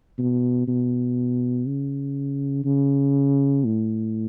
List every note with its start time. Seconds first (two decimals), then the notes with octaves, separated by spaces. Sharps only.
0.19 B2
0.68 B2
1.67 C#3
2.65 C#3
3.65 A2